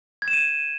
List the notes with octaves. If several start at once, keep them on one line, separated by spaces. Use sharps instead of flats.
G#6
E7
D#7